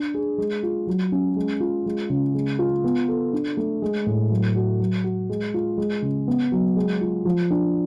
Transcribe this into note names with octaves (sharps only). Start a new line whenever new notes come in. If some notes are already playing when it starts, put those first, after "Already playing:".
Already playing: D4
G#4
G#3
F4
F#3
C#4
G#3
F4
G#3
C#3
G#3
F4
B3
A4
D4
A3
G#3
A2
F#3
F#4
F#3
F#4
G#3
F4
G#3
C#3
B3
F#3
G#3
F4
F3
D4